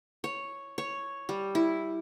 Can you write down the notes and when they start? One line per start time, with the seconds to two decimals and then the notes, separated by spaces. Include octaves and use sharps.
0.24 C#5
0.78 C#5
1.29 G3
1.55 E4